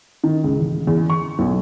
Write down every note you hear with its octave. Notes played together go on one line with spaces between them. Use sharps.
D#3
C#2
A1
E2
C#6
B1